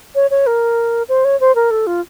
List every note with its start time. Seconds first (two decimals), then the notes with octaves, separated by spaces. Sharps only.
0.15 C#5
0.31 C#5
0.47 A#4
1.09 C5
1.25 C#5
1.40 C5
1.55 A#4
1.71 A4
1.87 F4